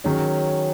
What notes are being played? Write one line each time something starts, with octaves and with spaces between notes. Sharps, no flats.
D#3 F#3 C#4 G#4